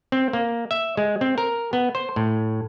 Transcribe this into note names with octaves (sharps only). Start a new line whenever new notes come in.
C4
A#3
E5
G#3
C4
A#4
B3
C5
A2